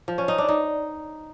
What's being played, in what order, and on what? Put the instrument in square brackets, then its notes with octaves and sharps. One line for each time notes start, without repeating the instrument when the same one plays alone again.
[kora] F3
C#4
D#4
D4
D#4